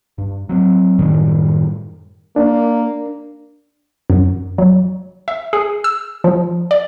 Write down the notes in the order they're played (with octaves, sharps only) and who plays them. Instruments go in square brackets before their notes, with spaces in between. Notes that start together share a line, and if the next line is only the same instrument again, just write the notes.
[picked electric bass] G2
F#3 C4
F#2 A2 D#3 G3
[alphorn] A#3 [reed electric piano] D4
[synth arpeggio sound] F#2
F#3
E5
G#4
E6
F3
D5